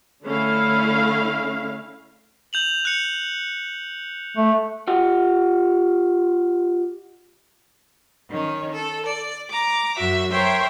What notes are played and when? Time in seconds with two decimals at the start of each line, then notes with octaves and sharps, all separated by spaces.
0.24 D3 A3 C#4 E4 F5
2.53 G6 F7 F#7
2.85 F#6 C#7
4.37 A3
4.88 F4 G4 D#5 F#5
8.30 D#3 C#4
8.73 A4
9.06 D5
9.49 A#5 D6
9.97 F#2 F#4 E5
10.31 A#4 C5 C#5 E5 G5